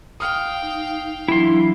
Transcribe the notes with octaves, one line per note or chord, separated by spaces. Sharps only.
F5 G5 D#6 F6
D#4
E3 F#3 D4 E4 C6